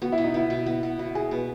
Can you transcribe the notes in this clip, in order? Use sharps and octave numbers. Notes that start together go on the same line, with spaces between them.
B3 F#4
E4
B2
D#4
B3 E4
B2
B3
B2
E4 F#4
F#4 G#4
B2 B4